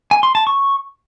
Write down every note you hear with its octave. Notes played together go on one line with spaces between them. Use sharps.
G#5
C6
A5
C#6